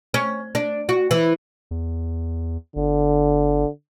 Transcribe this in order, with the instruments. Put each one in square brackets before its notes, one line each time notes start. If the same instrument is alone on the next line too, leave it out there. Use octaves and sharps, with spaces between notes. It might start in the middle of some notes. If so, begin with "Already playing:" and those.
[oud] C#4
D4
F#4
E3
[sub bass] E2
[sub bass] G1 [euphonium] D3